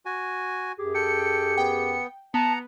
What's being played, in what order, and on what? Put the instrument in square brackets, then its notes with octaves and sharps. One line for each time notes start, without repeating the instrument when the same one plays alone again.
[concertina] F#4 G#5
[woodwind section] F#2 G4 G#4
[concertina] A4 G5 [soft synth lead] C#7
[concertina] B3 [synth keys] G5
[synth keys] B3 [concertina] F#5 A#5 [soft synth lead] A5